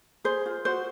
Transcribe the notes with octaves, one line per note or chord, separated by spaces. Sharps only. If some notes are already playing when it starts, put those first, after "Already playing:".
G#4 C5
F4
F#4 C5